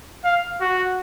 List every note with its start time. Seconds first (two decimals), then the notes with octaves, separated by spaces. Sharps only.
0.24 F5
0.61 F#4